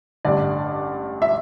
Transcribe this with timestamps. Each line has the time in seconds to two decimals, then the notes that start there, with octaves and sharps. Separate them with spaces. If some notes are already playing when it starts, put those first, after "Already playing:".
0.25 A1 G2 D3 D5
1.22 E5